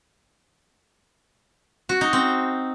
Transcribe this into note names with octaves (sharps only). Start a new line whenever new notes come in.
F#4
D#4
C4